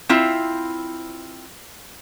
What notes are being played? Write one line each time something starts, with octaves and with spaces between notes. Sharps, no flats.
C4 E4 F4